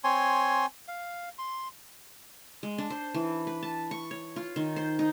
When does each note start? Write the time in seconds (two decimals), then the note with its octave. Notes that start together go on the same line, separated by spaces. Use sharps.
0.04 C4 C#5 G#5 C6
0.88 F5
1.39 C6
2.63 G#3
2.78 D4
2.90 C5
3.14 E3
3.47 B4
3.63 A5
3.91 C#6
4.11 C#5
4.36 F4
4.56 D#3
4.76 C5
4.99 D#4